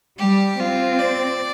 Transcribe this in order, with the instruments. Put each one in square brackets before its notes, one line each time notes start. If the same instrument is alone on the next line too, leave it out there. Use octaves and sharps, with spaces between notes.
[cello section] G3 [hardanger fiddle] G4
[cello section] C4 [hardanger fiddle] F4
[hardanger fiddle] D5